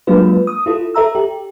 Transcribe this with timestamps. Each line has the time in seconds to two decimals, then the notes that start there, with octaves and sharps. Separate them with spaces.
0.07 F#3 G#3 A#3 D4 F4 B4
0.47 D#6
0.66 E4 F4 A4
0.94 A4 E5 A#5 E6
1.15 G4